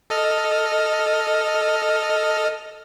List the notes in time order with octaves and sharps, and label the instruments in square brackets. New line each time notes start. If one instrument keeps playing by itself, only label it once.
[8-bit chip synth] A4 D#5 F6